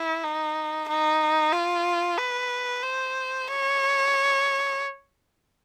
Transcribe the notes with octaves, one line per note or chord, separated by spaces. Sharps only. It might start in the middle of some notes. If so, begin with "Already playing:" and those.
Already playing: E4
D#4
D#4
F4
B4
C5
C#5